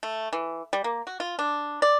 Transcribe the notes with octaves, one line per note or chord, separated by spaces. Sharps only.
A3
E3
G3
A#3
F#4
F4
D4
D5